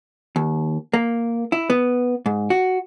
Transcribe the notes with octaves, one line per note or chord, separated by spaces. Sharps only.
D#2
A#3
E4
B3
G#2
F#4